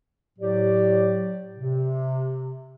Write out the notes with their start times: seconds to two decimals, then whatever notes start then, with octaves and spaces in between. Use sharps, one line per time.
0.39 A2 F#3 G4 D5
1.58 C3